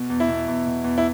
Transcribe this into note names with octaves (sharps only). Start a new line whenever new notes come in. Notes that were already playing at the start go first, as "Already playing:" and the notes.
Already playing: B2
E2
E4
B2
E2
B2
E2
E4